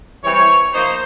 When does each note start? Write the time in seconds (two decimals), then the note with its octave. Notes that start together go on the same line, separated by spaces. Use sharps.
0.24 E3 G3 C4 C#5
0.74 F3 A#3 D#4 C5